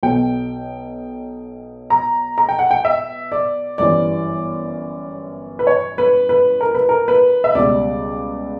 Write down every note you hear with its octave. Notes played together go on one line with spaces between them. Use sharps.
B1 B2 F#3 G5
A#5
A#5
G5
F#5
G5
E5
D5
G1 F#2 E3 G3 D5
B4
C#5
B4
B4
A#4
B4
A#4
B4
E5
C#2 B2 G3 D5